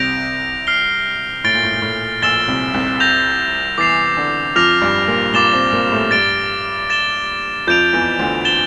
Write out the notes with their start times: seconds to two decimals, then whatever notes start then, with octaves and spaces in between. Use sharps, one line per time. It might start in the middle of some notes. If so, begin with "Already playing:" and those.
Already playing: C2 C3 G6 A#6 D7 F7
0.67 F6 C7 G7
1.44 A2 A6 D7 G7
1.54 A#2
1.63 A2
1.73 A#2
1.82 A2
2.22 A#1 A#2 E6 A6 E7 G7
2.48 C2 C3
2.74 C2 C3
3.00 G6 A#6 F7
3.78 E2 E3 D6 A6 C7 F7
4.17 D3 D4
4.56 F2 F3 D6 F6 A#6 F7
4.81 G2 G3
5.08 A#2 A#3
5.34 A#2 A#3 D6 A6 E7 G7
5.53 C3 C4
5.73 A#2 A#3
5.87 G3
5.92 A2 A3
6.11 G2 G3 A6 D7 G7
6.90 A6 E7 G7
7.67 F2 F3 G6 D7 F7
7.93 E2 E3
8.19 D2 D3
8.45 A6 E7 G7